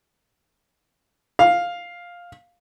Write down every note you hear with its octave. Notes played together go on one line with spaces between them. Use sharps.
F5